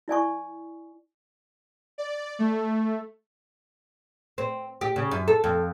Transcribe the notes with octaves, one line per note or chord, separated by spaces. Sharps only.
E4 D5 G#5 C#6
D5
A3
C4
G4
C#3
F#2
A4
F2